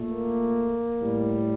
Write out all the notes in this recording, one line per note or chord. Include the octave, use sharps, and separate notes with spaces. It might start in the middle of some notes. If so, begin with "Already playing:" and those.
Already playing: A#2 A3
A#3
A2 G3